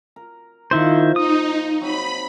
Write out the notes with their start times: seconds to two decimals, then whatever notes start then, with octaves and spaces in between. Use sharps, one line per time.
0.16 A#4
0.71 D#3 F3 A#3 E4 F4 C5
1.16 D#4 D#6
1.81 F#3 C4 B5